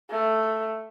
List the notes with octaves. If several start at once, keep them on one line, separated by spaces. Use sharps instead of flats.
A3